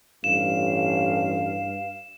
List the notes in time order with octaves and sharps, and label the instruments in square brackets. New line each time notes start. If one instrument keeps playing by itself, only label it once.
[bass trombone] A1 [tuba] G2 [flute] F5 [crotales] E7